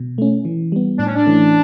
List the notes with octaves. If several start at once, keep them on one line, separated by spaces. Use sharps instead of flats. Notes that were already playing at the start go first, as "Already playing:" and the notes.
Already playing: B2
A3 C#4
E3
G3 B3
A2 D4
C#4
D4
E3 A3 C#4